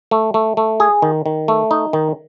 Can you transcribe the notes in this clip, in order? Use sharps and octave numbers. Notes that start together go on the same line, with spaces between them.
A3
A3
A3
G#4
D#3
D#3
A3
D#4
D#3